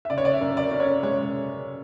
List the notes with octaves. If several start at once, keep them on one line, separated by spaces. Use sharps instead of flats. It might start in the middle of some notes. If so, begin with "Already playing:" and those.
E5
C#3 D5
C#5
D5
E5
F#2
D5
C#4
C#5
G#3 C#5